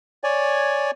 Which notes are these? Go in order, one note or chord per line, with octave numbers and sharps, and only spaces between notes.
C#5 D5 G#5